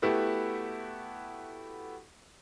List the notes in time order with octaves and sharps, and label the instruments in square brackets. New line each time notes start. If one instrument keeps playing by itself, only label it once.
[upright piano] A3 B3 E4 F#4 G4